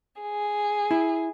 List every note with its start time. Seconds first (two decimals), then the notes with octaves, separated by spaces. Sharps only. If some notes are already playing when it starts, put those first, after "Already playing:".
0.21 G#4
0.91 E4